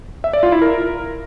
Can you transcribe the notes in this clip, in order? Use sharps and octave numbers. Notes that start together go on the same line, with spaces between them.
E5
D5
F4
E4
A#4